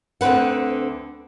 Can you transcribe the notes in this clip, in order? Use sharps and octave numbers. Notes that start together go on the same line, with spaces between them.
D2 D3 C4 B4 F#5